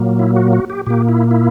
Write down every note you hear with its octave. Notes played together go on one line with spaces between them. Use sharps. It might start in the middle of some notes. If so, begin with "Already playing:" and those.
Already playing: A#2 F#3 A#3
E4
F#4
F#4
G4
A#2 A#3 G4
E4
E4